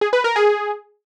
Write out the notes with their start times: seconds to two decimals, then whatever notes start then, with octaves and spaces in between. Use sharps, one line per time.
0.01 G#4
0.13 B4
0.24 A#4
0.36 G#4